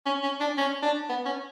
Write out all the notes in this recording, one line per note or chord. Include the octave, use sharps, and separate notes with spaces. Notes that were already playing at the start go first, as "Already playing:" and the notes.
C#4
C#4
D4
C#4
D4
B3
C#4